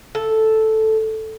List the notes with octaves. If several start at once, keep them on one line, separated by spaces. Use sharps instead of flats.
A4